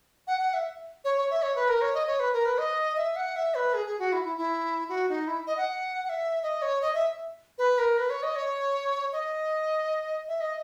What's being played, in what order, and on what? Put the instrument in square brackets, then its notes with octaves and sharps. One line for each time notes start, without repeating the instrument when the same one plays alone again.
[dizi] F#5
F#5
E5
C#5
C#5
E5
C#5
B4
A#4
C#5
D#5
C#5
B4
A#4
B4
D#5
E5
F#5
E5
B4
G#4
G#4
F#4
E4
E4
E4
F#4
D#4
E4
D#5
F#5
F#5
E5
D#5
C#5
D#5
E5
B4
A#4
B4
C#5
D#5
C#5
D#5
E5
D#5